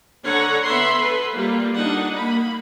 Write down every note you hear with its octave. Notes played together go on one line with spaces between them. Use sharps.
D3 C#5 F#5 A#5
B3 E5 B5 C6
A4 B4
G3 A#3 F4
D4 D#4 F#5
A#3 B5